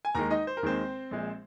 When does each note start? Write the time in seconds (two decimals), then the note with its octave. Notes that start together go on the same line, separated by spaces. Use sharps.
0.05 G#5
0.15 D#2 D#3 G#3 A#4 A#5
0.30 D#4 D#5
0.47 C5
0.57 A#4
0.63 D#2 D#3 G#3 C4 C5
1.11 A#1 A#2 G#3